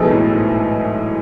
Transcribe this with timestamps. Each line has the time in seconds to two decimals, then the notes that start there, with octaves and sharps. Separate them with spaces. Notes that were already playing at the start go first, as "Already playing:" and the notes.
Already playing: B1 B2 E3 G#3 D#4 A4
0.11 A2
0.31 G#2